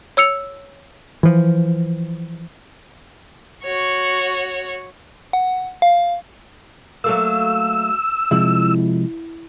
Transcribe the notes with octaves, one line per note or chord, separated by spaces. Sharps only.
C#5 E6 C#7 F7
E3 F3
F#4 C#5
F#5
F5
F#3 A3 A#3 E6
C3 F3 G#3 E4